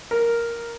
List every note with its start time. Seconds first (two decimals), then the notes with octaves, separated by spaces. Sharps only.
0.11 A#4